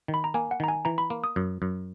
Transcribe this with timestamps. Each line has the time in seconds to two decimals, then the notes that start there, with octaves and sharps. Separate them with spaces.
0.08 D#3
0.14 B5
0.24 A#5
0.34 A#3 G#5
0.51 F#5
0.60 D#3 A#5
0.68 G#5
0.85 E3 A#5
0.98 B5
1.10 A#3
1.24 D#6
1.36 F#2
1.62 F#2